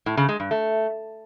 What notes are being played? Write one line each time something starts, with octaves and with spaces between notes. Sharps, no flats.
A2
C#3
G#3
G2
A3